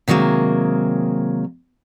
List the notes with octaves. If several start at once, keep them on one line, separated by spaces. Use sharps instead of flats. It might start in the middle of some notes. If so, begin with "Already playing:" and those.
C3 D#3 F#3 G#3 A#3